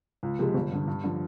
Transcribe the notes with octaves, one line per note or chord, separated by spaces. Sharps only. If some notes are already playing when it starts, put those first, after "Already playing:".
C#2
C3 F3 G#3
G1
G2 D3
G2
D3 F3